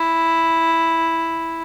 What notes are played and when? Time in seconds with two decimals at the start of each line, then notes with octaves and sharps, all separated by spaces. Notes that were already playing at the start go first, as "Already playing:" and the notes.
Already playing: E4